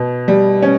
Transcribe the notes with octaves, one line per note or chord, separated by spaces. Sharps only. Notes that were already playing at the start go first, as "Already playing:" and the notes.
Already playing: B2
G3
C#4